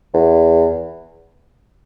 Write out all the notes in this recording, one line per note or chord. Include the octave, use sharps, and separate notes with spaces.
E2